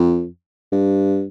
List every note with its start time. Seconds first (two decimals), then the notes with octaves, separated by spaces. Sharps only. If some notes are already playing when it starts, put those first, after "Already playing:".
Already playing: F2
0.72 G2